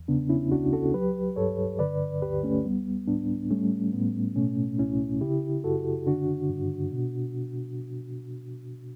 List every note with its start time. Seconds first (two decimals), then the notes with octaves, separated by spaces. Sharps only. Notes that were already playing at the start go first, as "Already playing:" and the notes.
Already playing: E2
0.08 C#3 B3 D4
0.29 C#4 E4
0.52 C#2 D4 F#4
0.73 F#4 A4
0.94 F#3 G4 B4
1.36 G2 A4 C#5
1.79 D3 B4 D5
2.22 D2 G4 B4
2.43 A3 C#4
2.65 G3 B3
3.08 A2 B3 D4
3.50 G3 A3 C#4
3.93 A2 B3
4.36 B2 A3 C#4
4.79 C#2 C#4 E4
5.21 C#3 E4 G4
5.64 F#2 F#4 A4
6.07 D3 D4 F#4
6.49 G2
6.92 B2